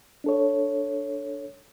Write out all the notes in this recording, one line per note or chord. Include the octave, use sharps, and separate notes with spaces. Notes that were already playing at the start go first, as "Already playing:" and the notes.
D4 A4 C#5